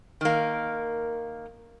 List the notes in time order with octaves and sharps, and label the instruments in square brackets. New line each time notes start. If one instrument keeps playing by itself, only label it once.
[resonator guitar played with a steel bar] D#3 A#3